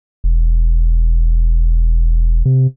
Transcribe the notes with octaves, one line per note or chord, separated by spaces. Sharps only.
E1
C3